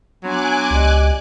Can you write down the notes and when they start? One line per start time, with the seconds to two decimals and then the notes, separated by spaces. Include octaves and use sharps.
0.24 F#3 B3 D4 G#5 C6 D6 F#6
0.70 C#2 G4 D5 D#5